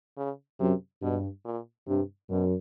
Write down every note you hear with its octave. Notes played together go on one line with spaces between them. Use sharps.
C#3
F#2 C3
G2 B2
A#2
G2 C3
F#2 B2